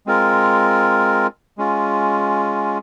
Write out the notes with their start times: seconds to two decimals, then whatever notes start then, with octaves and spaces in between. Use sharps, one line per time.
0.06 G#3 C4 F4 A#4
1.58 G#3 C#4 F4